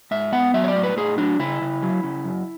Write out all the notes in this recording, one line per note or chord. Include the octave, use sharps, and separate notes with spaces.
G#2 E5
B3 F#5
F#3 E5
C#5
D5
A2
B4
A2 G#4
F#3 D4
C#3 E4
C#3
F#3
C#3
F#2